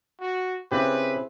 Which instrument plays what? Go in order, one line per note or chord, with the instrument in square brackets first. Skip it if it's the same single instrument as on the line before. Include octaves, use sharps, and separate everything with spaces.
[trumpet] F#4
[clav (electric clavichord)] C#3 G4 [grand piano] C4 E4 G#4 [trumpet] B4